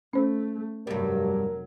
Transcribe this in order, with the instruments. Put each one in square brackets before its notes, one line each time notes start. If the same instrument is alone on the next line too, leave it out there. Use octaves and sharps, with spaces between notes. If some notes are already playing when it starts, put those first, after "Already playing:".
[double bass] A3 [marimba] C#4 C5
[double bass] F1 F#3 [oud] G2 G3 [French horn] A#4